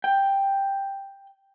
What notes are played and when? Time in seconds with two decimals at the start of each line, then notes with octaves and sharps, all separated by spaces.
0.04 G5